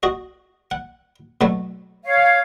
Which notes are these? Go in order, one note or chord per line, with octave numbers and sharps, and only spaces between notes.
F#4 D#5
F#5
B2 F#3 A3
C#5 F5